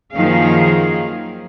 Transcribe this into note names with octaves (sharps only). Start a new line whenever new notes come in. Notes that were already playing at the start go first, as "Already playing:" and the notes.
F#2 D#3 F3 A#3 G#4 F5